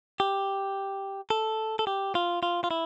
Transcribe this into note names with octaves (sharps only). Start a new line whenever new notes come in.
G4
A4
A4
G4
F4
F4
F4
E4